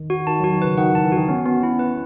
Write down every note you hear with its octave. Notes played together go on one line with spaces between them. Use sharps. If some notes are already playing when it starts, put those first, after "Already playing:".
Already playing: D#3
F#4
D#3 A5
F#3
F#4
D#3
C#3 B4
D#3 F#5
E3
A5
E3
D#3 F#4
B3 C#4
B3
E4
B4